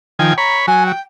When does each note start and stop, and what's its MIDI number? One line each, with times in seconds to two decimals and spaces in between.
0.19 0.34 51
0.19 0.34 53
0.19 0.35 79
0.19 0.34 80
0.38 0.66 73
0.38 0.56 82
0.38 0.66 83
0.67 0.92 54
0.67 0.84 80
0.86 1.01 79